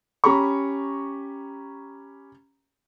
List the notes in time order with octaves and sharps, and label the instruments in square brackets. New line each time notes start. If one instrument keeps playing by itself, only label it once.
[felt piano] C#4 G4 A#5 B5 C#6